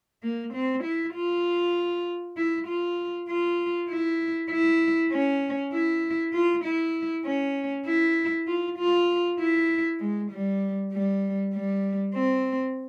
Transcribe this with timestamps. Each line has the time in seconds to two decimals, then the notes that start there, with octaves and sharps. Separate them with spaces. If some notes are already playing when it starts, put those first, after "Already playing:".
0.23 A#3
0.53 C4
0.84 E4
1.14 F4
2.37 E4
2.67 F4
3.29 F4
3.89 E4
4.50 E4
5.12 C#4
5.73 E4
6.34 F4
6.64 E4
7.25 C#4
7.86 E4
8.47 F4
8.78 F4
9.39 E4
10.00 G#3
10.31 G3
10.92 G3
11.53 G3
12.14 C4